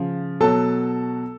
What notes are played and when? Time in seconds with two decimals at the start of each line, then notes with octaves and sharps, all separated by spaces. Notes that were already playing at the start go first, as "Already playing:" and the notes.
Already playing: C#3 F3
0.40 B2 F#3 A4 A5